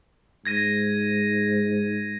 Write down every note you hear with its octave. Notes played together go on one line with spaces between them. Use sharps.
G#2 G#6 A#6 D#7